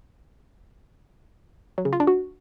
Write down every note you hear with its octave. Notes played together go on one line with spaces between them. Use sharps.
F#3
C#3
F4
D4
F#4